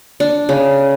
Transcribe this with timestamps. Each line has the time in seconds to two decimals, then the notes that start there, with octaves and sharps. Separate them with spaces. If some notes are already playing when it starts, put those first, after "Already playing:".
0.20 D4
0.49 C#3